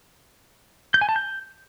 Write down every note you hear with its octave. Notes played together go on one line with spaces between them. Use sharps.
G6
G#5
A5
G6